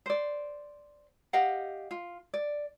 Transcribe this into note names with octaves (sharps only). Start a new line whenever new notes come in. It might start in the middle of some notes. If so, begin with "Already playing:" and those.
C5 D5
G4 D#5 F5 F#5
F4
D5